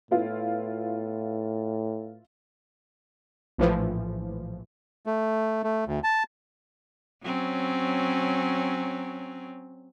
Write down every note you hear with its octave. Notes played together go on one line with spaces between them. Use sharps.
A2 B3 E4 F4
A#1 A2 E3 F3
A3
A3
D2
A5
F#3 C4 C#4